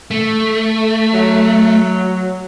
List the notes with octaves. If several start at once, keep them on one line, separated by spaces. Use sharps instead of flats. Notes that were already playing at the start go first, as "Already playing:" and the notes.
A3
F#3